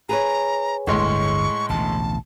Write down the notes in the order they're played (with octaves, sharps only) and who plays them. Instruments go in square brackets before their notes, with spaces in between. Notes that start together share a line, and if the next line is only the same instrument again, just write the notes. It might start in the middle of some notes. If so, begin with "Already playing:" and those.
[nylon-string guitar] G#4 B4 C#5 [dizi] A#5
[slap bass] G1 D2 [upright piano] A2 G#3 C6 [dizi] C#6
[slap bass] A1 D2 B2 [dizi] A5